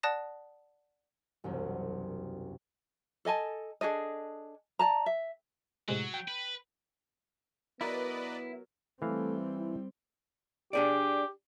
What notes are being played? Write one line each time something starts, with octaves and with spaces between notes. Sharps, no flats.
D5 F#5 A5 D#6 F#6 A#6
E1 C2 F#2
A4 D#5 G#5 A5
D4 G#4 A4 D#5
D5 A5 A#5
E5
A2 C3 F#3 G#3
G5
B4
F#3 B3 E4 A#4 B4 D5 D#5
E3 G3 A3 C4 F5
E4
D4 G4 G#4 D5